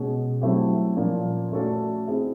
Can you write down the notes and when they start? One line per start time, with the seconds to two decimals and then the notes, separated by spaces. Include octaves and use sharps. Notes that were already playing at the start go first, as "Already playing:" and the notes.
Already playing: B2 G#3 C#4
0.41 F#3 A3 C4 E4 G4
0.97 A#2 F3 A#3 C#4
1.52 A3 C#4 F#4 A4 D5
2.08 C4 E4 G#4